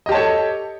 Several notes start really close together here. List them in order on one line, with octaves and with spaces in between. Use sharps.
D#5 G4 A5 C#5 A4